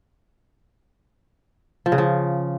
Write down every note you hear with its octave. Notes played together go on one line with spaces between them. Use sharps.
F3
C#3
F3